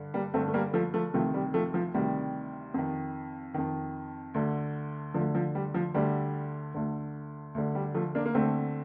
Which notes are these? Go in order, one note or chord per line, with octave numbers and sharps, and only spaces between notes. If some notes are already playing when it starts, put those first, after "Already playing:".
Already playing: G2 D3
G3 A#3
G2 D3 A3 C4
A3
G3 A#3
F3 A3
F3 A3
D2 C3 D#3 F3 A3
G3
F3 A3
F3
D2 C3 D#3 G3
F2 D#3
F2 D#3
D2 D3
D2 D3 F3
F3
G3
F3
D2 D3 G3
D2 D3
D2 D3
G3
F3 A3
A#3 D4
A#3
D2 D3 A3 C4